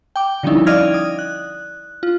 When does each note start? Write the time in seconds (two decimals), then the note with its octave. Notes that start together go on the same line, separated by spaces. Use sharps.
0.16 G5 D6
0.43 D3 F3 G3 C#4 D#4 E4
0.66 D5 D#5 F5 F6 G#6 A#6
0.94 D#6
1.19 F#6
2.03 F4